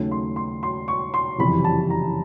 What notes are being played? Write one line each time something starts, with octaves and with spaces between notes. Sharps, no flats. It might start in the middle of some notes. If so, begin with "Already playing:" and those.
Already playing: D#2 C#3 F#3 A3
C6
C6
C6
C#6
C6
F#1 F2 C3 E3 G3 B5
A5
A#5